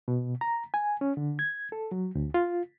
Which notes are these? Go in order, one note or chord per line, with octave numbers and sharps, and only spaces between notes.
B2
A#5
G#5
C#4
D3
G#6
A4
F#3
D2
F4